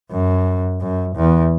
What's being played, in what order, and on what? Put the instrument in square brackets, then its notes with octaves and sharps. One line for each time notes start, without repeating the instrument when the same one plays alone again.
[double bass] F#2
F#2
E2